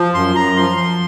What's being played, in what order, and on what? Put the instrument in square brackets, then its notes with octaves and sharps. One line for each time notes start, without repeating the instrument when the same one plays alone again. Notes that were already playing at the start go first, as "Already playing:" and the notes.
Already playing: [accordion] F3
F#2 C6
F#2 A#5
F3 C6
F3